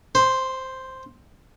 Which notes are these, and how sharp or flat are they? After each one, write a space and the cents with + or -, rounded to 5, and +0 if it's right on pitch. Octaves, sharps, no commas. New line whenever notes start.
C5 +0 C6 -40